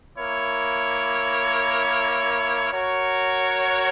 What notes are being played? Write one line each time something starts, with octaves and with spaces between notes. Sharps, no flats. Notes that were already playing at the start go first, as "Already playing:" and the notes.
A#3 E4 A#4 C#5
F#4 A#4 C#5